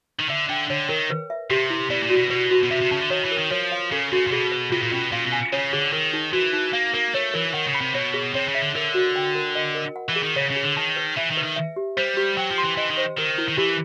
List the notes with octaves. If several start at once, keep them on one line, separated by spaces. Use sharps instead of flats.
D#3
D3 E5
D3 G5
D3 C#5
D#3 A#4
B4
E5
C3 G4
E4
B2 D5
A#2
F#4
B2
B2 B4
F#4
B2
C3 E5
C3
C#3 A5
D3
D#3 C#5
E3
A#4
D#3
F3 C#5
F5
C#3 A4
C#3 F#4
A#2
B2 G#4
B4
C3 F4
A#2
B2 C#4
A#2 F5
B2
G#5
C#3 C#5
D3 G#4
D#3 A#4
D#4
E3 F#4
D#4
A#3 F5
A#3 A#4
A3 C#5
E3 A#4
D#3 F#5
C#3
B5
C3
B2 C#5
G#4
C3 C#5
C#3
E5
D3
D3 A#4
F#4
G5
A#4
D#5
A#4
F#5
E3
G#4
D#3
C#3 C#5
C#3
G#4
D3
D#3 A5
B4
E3 E5
D#3
B4
D#3
E5
G4
G3 C5
G4
F#3 G5
F3
C6
E3
E3 D#5
D#3
C5
D#3 A#4
E4
D#3
E3 G4